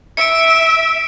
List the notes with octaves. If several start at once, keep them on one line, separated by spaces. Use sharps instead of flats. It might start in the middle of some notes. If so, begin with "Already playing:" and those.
E5 C#7 D7